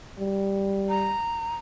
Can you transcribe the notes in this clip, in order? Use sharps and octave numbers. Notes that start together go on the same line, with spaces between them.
G3
A#5